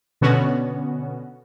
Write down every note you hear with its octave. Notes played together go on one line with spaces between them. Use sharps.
B2 D3 B3 C#4 F#4